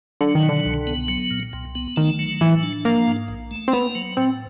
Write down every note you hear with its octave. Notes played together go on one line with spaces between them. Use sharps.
D3 F#3
D#3
B2
D3
C2
B3
F#3
A#2
C2
B3
D#3 A3
F#3
A2 E3
D4
F3 A#3
G#2
A#1
A3
C4
A#3 B3
F#3
A2 C4